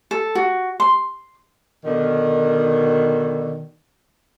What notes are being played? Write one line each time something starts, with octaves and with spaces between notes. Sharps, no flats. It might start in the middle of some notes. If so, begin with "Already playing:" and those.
A4
F#4
C6
B2 D3 D#3